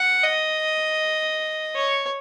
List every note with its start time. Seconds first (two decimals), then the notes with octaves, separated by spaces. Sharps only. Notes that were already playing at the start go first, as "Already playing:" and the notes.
Already playing: F#5
0.23 D#5
1.76 C#5